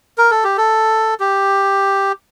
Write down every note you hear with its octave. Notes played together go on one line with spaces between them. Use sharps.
A#4
A4
G4
A4
G4